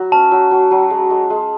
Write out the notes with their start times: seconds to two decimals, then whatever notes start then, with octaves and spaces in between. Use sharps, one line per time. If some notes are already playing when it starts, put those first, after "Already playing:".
Already playing: F#3
0.12 C#4 A5
0.32 F#3
0.51 F#3
0.71 F#3
0.90 G#3
1.10 G#3
1.30 G#3